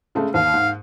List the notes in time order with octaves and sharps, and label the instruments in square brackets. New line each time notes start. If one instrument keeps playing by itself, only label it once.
[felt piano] C#3 G#3 A3
[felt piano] D#2 [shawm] F5
[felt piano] G#2